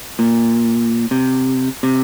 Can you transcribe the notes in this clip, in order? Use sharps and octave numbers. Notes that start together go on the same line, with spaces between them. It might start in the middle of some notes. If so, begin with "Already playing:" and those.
A#2
C3
C3